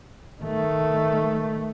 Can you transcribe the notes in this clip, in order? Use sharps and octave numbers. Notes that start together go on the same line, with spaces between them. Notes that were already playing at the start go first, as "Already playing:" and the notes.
D#3 A3